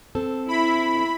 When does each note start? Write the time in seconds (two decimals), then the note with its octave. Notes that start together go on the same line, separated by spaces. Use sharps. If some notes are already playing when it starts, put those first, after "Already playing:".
0.15 C4 A4
0.48 E4 B5